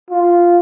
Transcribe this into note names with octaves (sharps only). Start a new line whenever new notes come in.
F4